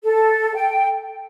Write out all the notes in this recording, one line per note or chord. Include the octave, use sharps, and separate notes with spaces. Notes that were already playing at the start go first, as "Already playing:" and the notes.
A4
G5